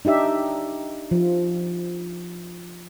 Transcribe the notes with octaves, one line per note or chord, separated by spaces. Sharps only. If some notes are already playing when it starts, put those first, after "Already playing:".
D4 D#4 G4 E5
F3